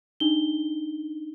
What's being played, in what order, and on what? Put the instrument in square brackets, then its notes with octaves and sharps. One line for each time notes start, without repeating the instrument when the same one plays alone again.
[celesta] D4 D#4 G7